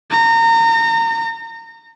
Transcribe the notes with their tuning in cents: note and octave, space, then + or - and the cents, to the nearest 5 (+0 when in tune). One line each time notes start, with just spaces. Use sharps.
A#5 -30